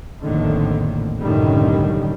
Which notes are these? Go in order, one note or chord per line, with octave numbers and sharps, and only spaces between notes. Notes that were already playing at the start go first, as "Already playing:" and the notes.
A#1 F2 A2 D3 D#3
C2 F#2 A2 D3 D#3 G3